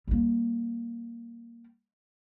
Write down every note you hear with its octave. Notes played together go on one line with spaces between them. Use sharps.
G3 A#3